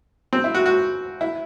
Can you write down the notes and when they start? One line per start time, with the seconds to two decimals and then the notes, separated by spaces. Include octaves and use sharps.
0.33 C4
0.44 E4
0.55 F#4
0.66 F#4
1.21 E4